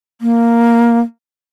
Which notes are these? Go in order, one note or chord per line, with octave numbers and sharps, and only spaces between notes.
A#3